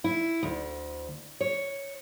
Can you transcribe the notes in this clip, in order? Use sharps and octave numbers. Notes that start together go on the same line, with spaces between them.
E4
D2
C#5